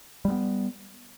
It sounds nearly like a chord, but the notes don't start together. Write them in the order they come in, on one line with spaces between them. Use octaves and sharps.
G3 G#3 B3